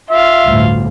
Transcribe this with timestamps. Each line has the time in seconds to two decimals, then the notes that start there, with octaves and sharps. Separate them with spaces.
0.10 F4 E5 F5
0.45 G1 D2 A2